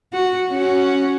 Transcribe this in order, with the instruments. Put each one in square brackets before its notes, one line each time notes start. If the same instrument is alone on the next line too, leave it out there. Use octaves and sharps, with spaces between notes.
[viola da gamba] F#4
C#4 F#4